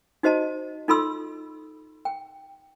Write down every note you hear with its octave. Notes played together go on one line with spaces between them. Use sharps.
D#4 F#4 C5 D#5 A5
D#4 F4 A4 B5 C6 E6
G5